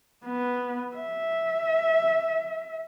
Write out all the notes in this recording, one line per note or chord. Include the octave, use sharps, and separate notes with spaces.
B3
E5